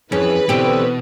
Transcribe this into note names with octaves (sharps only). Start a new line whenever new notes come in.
F2 E3 C#4 G#4 B4
B2 D3 C4 G4